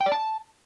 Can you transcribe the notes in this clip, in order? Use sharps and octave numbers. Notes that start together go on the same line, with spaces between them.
G5
D5
A5